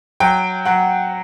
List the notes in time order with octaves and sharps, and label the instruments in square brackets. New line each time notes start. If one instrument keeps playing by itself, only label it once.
[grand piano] F#3 G5
F#3 F#5